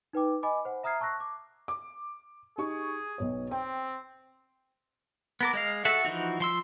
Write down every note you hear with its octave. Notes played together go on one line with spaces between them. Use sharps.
D#4 B4 G5 D6
D#5 G#5 B5 D6
C5 F#5
E5 A#5 D#6 F6 G#6 C7
A5 C#6 E6 F#6 A#6
D6
D6
D#4 G4 G#4 C#6
B1 B2 C#5
C4 G5
B3 A#4 D6
G#3 D#5 F5
F#4 A4 E5 F#5
E3 F3 D#4 F#4
F3 C6 E6